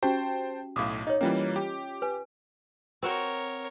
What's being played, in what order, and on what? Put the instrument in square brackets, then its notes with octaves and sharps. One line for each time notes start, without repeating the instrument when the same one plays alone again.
[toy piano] C#4 F#4 G4 [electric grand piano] C5 G5 A5
[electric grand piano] B1 A2 [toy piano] F5 D6 D#6
[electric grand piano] D#4 [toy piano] C#5 D#5
[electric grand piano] E3 G3 A#3 [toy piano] C#4 F4
[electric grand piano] G4
[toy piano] B4 G#5
[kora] C4 F#4 [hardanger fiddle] A#4 C#5